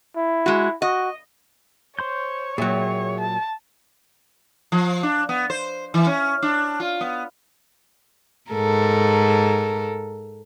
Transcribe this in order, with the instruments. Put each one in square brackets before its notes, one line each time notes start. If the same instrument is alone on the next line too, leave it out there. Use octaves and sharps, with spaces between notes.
[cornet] E4
[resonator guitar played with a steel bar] G#3 F#4
[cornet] F#4 [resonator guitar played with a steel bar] D#5
[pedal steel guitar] C5 C6 G6 [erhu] C#5
[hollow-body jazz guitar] A#2 F#3 [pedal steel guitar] G#4 E5 G5
[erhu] A5
[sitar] F3
D4
B3
C5
E3
C#4
D4
F4
B3
[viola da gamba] G#2 A4 A#4